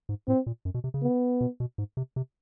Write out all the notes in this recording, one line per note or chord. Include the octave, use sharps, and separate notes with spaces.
G#2
A2 C4
A#2
F#2
B2
C3
C#3
B3
B2
B2
G#2
C3
C3